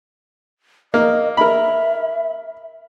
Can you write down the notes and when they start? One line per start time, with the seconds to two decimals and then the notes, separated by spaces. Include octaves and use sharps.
0.94 A#3 D#5
1.37 A#4 E5 B5